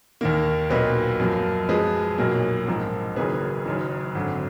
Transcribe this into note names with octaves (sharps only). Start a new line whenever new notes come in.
D#2 D#3 A#3
B1 A#2 F#3 A#3 B4 D#5
F#2 F3 A#3
F#2 F3 G#3 G#4 B4
B1 A#2 F#3 A#3
A#1 G#2 F3 A#4
F#1 F#2 D#3 A#3 G#4 B4
F#1 F#2 D#3
G#1 F#2 D3